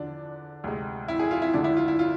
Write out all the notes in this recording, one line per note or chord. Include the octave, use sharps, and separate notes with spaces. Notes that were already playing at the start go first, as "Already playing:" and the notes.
Already playing: E2 D3 F3 D4
D2 C3 G#3
E4
G#4
F4
E4
D2 D3 G#3 D4
E4
F4
E4
F4